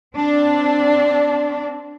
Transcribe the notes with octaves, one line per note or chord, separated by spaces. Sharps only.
C4 D4